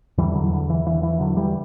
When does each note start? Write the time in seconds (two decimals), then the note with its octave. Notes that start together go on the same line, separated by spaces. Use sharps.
0.18 E2 D3 E3 G3
0.35 D3 F#3
0.53 D3
0.70 E3
0.87 E3
1.03 E3
1.20 D3 F#3
1.37 E3 G3